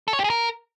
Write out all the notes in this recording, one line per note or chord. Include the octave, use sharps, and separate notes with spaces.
A4
C#5
G4
G#4
A#4